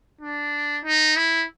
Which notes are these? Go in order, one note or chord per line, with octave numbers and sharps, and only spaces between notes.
D4
D#4
E4